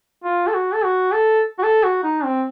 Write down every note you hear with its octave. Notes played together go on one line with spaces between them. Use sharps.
F4
A4
F#4
A4
F#4
A4
F#4
A4
F#4
D#4
C4